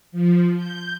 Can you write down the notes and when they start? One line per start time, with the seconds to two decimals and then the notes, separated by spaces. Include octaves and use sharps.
0.12 F3
0.56 G6